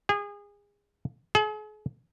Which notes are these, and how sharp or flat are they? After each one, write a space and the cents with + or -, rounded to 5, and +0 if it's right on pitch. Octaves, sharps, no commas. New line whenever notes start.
G#4 -30
G#4 +40